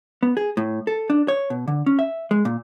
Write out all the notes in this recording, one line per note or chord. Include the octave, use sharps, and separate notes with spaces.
B3
G#4
A2
A4
D4
C#5
B2
D3
C#4
E5
G#3
A#2